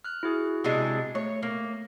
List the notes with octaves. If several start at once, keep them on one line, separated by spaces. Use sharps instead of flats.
F6 F#6
E4 F#4 G#4
C3 G#3 D4
A3 C#5
A#3